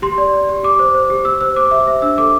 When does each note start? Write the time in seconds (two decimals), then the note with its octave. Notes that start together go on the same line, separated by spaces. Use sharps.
0.02 G4 C6
0.18 D5
0.34 D5
0.49 G4
0.63 G4 D6
0.79 C5
0.94 C5
1.10 G4
1.25 G4 E6
1.41 C5 E6
1.56 C5 D6
1.71 G4 E5
1.87 C5 E5
2.02 D4 E6
2.18 A4 D6